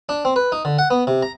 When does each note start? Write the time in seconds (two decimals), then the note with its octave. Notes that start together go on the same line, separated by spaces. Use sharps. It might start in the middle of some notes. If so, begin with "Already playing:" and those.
0.09 D4
0.25 C4
0.36 B4
0.52 D#4
0.65 D3
0.78 F#5
0.90 B3
1.07 C3
1.22 A#5